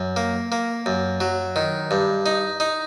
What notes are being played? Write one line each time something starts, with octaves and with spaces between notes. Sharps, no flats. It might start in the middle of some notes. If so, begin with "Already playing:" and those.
Already playing: F#2
A#3
A#3
F#2
F#3
D#3
G2
D#4
D#4